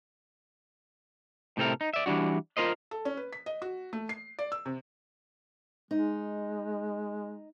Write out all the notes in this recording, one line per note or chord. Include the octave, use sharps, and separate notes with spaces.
A2 C3 C4 A4 A#4
D#4
D5 E5
E3 G3 D4 F#4
F4 A#4 C5 D#5
A4
C#4
B4
B6
D#5
F#4
A3
C7
D5
E6
C3
G#3 D#4